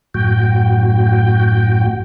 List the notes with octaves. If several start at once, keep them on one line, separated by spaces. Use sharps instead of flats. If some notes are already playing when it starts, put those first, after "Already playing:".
F#2 A2 F#4 G5